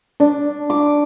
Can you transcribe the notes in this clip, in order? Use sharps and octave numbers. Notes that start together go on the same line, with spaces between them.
D4
D6